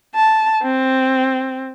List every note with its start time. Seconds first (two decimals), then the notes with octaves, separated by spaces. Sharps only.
0.16 A5
0.63 C4